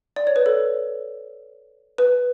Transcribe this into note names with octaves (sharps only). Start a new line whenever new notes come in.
D5
C#5
B4
A4
B4